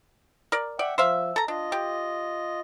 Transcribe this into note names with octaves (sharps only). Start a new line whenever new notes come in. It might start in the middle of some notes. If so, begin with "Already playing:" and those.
A#4 D5
D5 E5 F#5 G5
F3 C5 E5 F5
A4 A#5
D4 F4 D#5
G4